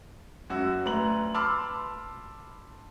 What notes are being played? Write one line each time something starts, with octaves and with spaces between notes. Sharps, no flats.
F#2 F#4 E6
D2 B4 A#5 F#7
A5 B5 C6 D6 E6 F6